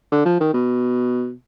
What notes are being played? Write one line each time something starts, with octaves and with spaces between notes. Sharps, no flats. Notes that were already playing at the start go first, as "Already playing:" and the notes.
D3
F3
D#3
B2